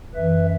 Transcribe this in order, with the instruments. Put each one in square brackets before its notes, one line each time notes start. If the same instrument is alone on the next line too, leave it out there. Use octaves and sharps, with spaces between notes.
[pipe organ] F#2 E3 B4 E5